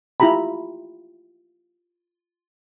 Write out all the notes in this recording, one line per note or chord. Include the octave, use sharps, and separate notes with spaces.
E4 F4 G4 A#5 B5